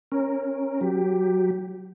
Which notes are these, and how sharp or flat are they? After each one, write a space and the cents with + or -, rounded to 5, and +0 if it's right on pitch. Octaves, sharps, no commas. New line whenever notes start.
C#4 -20 A#4 +0
F#3 +0 G4 +0